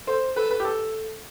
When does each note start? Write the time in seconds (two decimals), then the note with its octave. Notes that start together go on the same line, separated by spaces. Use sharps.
0.07 A4 C5
0.36 A4 B4
0.51 B4
0.60 G4
0.65 A4